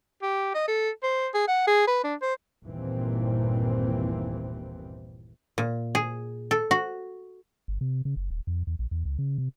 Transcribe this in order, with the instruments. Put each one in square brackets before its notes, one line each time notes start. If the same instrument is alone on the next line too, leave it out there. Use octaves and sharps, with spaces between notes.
[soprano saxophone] G4
D#5
A4
C5
G#4
F#5
G#4
B4
D4
C5
[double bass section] G1 D#2 A#2 E3 C4
[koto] A#2
G#4
A4
F#4
[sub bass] G1
C3
C#3
F#1
D#1
F2
E2
A#1
E2
C#2
C#3
C3